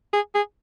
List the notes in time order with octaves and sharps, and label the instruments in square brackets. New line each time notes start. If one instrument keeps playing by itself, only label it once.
[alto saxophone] G#4
G#4